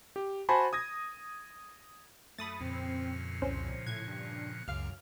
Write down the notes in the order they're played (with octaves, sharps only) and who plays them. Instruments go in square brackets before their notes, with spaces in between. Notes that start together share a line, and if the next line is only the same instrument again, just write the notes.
[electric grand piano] G4
F#4 C5 G#5 A5 B5 C6
D#6 G#6 A#6
[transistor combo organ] F#2 [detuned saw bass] A3 [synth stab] B5 D#6 A6
[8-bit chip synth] F2 [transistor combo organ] A#2 C#3 F3 [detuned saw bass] C4
[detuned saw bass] C2 [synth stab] C#4 C5
[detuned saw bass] A2 [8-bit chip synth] F#6 [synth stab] G#6
[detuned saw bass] G2
[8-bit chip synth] C#2 C#3 [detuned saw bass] F#2 [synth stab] F5 F6